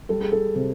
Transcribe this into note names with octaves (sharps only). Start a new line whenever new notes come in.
G3 A4
G#4
A4
C3